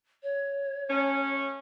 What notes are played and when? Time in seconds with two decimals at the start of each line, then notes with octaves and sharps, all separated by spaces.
0.23 C#5
0.90 A3 C#4